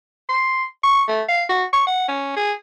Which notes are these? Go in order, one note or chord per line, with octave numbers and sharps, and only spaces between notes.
C6
C#6
A3
F5
F#4
C#6
F#5
C#4
G#4